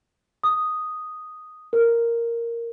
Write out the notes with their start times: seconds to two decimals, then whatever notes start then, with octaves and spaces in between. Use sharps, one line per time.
0.44 D#6
1.73 A#4